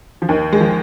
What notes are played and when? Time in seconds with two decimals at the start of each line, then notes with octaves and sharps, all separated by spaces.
0.22 F3
0.29 D#2 D#3
0.52 G#3
0.60 F3